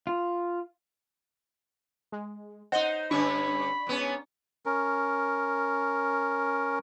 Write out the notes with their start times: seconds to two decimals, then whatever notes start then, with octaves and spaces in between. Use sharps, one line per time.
0.07 F4
2.12 G#3
2.72 D#4 C5 D#5 F#5 G7
3.11 G2 D3 C#4 D4 B5 C#6
3.87 G#2 B3 C#4
4.66 C#4 A#4